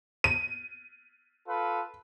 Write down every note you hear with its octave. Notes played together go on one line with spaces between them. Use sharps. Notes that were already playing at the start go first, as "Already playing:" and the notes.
D#7
F4 A4 B4